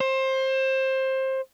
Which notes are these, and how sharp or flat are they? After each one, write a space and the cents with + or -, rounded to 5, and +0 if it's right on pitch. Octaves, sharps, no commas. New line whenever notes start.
C5 +20